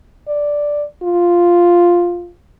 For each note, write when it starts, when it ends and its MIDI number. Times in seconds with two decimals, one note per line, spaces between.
0.28 0.84 74
1.03 2.31 65